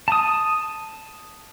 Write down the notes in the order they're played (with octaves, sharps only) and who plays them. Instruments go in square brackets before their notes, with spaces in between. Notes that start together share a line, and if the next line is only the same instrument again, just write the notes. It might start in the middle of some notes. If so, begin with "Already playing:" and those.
[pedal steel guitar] A5 D#6